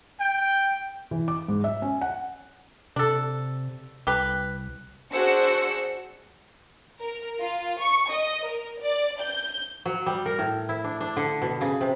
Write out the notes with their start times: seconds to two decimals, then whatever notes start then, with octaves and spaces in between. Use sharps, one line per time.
0.19 G5
1.11 E3
1.28 D6
1.48 G#2
1.64 E5
1.82 C#4
2.01 F#5
2.96 C3 D4 A4
4.07 C2 G4 B4
5.12 D4 F#4 G#4 C5 E6 C#7
7.00 A#4
7.39 F4
7.80 C#6
8.10 D#5
8.47 A#4
8.81 D5
9.21 G6
9.86 F#3
10.06 G3
10.26 A#4
10.39 A2
10.69 E4
10.84 D4
11.01 D4
11.16 D3
11.42 B2
11.61 C#3
11.81 C3